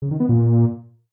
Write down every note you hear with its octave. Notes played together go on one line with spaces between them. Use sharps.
C#3
D#3
B3
A#2